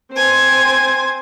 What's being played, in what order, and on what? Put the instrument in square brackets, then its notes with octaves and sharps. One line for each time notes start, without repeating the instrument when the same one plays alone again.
[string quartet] C4 C5 G#5